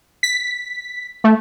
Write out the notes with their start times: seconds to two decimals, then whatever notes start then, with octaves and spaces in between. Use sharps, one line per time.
0.23 B6
1.24 A3